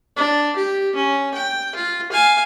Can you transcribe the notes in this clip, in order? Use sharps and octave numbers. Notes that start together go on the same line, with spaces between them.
D4
G4
C#4
G5
F4
F5 G#5